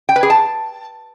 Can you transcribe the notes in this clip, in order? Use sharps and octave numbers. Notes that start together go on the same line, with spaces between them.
G5
B4
G#4
A5